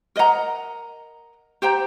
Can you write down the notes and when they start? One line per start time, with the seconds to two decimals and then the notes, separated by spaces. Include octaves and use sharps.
0.16 A#4 D#5 F#5 A#5
1.62 G4 C5 G5 A#5